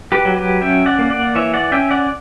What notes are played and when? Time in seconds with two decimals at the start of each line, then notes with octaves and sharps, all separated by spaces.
0.12 G4 B4
0.25 F#3
0.36 G4 B4
0.61 C#4 E5 G5
0.86 D5 F#5
0.99 A#3
1.10 D5 F#5
1.35 E3 C#5 E5
1.54 D5 F#5
1.72 C#4 E5 G5
1.91 D5 F#5